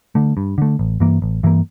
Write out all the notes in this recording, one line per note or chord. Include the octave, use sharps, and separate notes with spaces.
D3 A3
G2
D3 A3
A1
G2 E3 A#3
A1
G2 E3 A#3